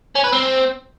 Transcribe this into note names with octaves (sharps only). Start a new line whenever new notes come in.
C#4
B4
C4